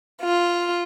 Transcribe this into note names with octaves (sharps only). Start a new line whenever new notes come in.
F4